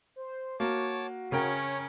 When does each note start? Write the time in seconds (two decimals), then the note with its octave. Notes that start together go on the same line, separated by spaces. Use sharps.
0.16 C5
0.60 A#3 F#4 C#5 A5 D6
1.32 C#3 C#4 A#4 C#5 G5